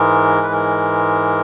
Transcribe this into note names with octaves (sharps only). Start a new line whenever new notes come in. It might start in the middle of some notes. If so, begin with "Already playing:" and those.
Already playing: G#2 E3 G#3 A#4
B4
A#4